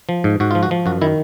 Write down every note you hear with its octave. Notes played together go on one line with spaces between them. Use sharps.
F3
G#2
G#2 F#4
F3 F4
F#4
F3
F#2 F#4
D#3 E4